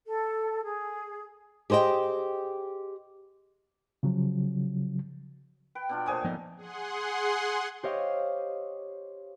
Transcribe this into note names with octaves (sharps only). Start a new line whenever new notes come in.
A4
G#4
G4 G#4 C5 D#5 G5
C#3 F3 F#3
B4 G5
B2 D4 F4
A#2 A3 C5 C#5 G#5 D#6
F3 B3 D#4
G#4 F#5 C6
G4 C5 C#5 D#5 F5